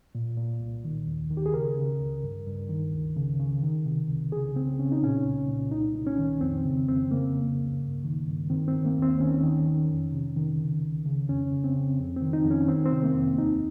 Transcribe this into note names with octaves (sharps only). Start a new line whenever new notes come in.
A#2
A#2
C2
D#3
D#2
D#3
G4
G#4
C#3 A#4
C#3
C#2
G2
G2
D#3
C#2
C#3
C#3
D#3
C3
C2
C#3 G#4
C#3 C4
C#3 C#4
D#4
A#2 C#4
C2
A#2
C2 D#4
C2
C#4
D#3
F2 C4
C#3
F2 C4
C#3 A#3
C#3
C#2
G2
D#3
G2
D#3 C4
C4
D#3
A#3
D#2
C4
D#3 C#4
D#3
D#3
F2
C3
D#3
C#3
C#2
C#3
F2 C#4
C#3
C4
C#3
F2
C4
D#3
D#4
F2
C#4
D#3 C4
C4
C3
A#3
F2
D#2 D#4